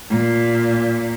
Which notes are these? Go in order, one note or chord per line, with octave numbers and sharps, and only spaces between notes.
A#2